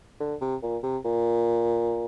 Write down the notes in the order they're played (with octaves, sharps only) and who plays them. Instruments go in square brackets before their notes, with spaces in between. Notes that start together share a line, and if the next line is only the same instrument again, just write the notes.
[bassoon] D3
C3
A#2
C3
A#2